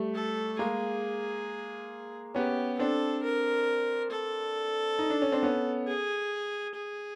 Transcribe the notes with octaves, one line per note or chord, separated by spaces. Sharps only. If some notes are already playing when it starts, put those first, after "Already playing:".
Already playing: G3 A3
A4
G#3 A#3 G#4
B3 C#4 G4
C4 D4 A4
A#4
A4
D#4
D4
C#4
C4 D4
B3 C#4
G#4
G#4